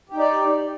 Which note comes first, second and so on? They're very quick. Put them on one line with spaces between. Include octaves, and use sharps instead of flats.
G4 D#4 D5